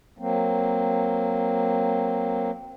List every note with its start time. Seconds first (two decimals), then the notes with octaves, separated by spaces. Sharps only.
0.19 F#3 A#3 C4